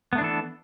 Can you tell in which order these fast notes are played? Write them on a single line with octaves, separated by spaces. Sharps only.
B3 A3 D4 E3 A4